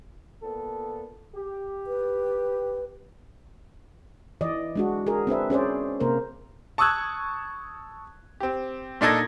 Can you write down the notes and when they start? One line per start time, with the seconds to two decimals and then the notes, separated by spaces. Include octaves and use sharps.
0.42 A#2 B3 A4
1.35 G4
1.87 B4
4.41 E3 D5 D#5
4.76 G#3 D4 F#4
5.07 G#4 A#4
5.27 C4 D4 B4 E5
5.50 C#4 G#4 C5 D5
6.00 C3 A#3 A#4 C5
6.78 A5 C#6 D#6 E6 F#6 G#6
8.40 C4 G4
9.01 A#2 D4 D#4 A4 G#6 A#6